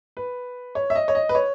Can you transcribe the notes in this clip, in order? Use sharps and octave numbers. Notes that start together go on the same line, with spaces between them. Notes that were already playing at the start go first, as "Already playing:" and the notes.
B4
C#5
E5
D#5
C#5
D#5
B4
C#5